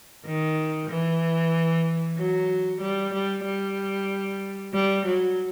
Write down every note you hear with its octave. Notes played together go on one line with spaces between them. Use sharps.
D#3
E3
F#3
G3
G3
G3
G3
F#3